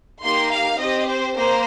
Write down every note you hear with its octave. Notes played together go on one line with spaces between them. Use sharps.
A#3 D#4 G4 C6
F5
C4 G4 D#5
C5
A#3 C5